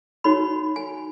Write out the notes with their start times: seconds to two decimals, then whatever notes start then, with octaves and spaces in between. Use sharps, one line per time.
0.24 D#4 F#4 C#5 B5
0.76 G#5